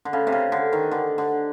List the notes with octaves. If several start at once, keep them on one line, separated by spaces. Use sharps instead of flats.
D3
C#3
C3
C#3
D3
D#3
D3
D3